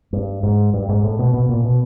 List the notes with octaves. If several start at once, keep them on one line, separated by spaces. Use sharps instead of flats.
G2
G#2
G2
G#2
A2
B2
B2
A#2
B2